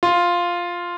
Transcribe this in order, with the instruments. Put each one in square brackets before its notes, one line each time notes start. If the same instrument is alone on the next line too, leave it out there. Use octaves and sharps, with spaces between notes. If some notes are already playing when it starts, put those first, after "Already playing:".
[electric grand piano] F4